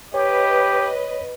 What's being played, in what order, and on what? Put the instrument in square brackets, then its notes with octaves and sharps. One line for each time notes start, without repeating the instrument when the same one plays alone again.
[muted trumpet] G4 [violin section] B4 D#5 [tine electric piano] C#5